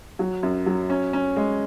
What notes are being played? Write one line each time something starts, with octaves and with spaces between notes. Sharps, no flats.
F#3
F#2
F#3
C#4
C#4
G#3